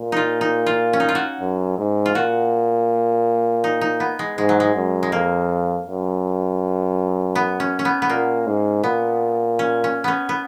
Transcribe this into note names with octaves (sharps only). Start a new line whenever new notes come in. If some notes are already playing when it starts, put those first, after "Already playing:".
Already playing: A#2
D#4 F4
D#4
F4
C#4
D#4
F4
F#4
F#2
G#2
F4
A#2 F#4
D#4
D#4
B3
G#3
G#2 G#3
F#3
G#3
F#2
G#3
F2 A#3
F#2
B3
C#4
C#4
B3
B3
A#2 A#3
G#2
A#2 B3
C#4
C#4
B3 C#4
B3